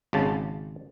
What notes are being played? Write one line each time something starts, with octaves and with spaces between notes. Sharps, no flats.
G#1 C#3 A5